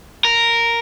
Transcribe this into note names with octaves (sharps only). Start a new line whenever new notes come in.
A#4